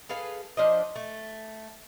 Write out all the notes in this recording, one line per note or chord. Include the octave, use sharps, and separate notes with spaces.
G#4 A4 B4 F5
F3 D4 C5 D#5
A3